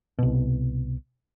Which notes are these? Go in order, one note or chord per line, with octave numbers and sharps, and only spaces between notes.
C2 B2